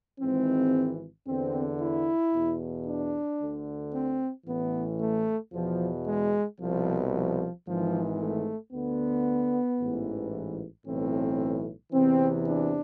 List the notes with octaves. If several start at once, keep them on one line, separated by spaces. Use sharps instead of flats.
G#1 G#2 E3 C4
E2 D3 C4
E4
E2 B2
D4
D2 D3
C4
A1 A2 E3 B3
A3
E2 B2 F3
G#3
C2 B2 F3
F3
G#1 G#2 E3 F3
A3
D2 D3 B3
A1 G#2 E3
B1 A2 E3 C4
E2 C3 E3 C4
D4